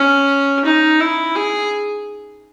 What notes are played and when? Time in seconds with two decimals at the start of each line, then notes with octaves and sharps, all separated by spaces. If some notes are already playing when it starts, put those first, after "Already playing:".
Already playing: C#4
0.65 D#4
1.01 E4
1.35 G#4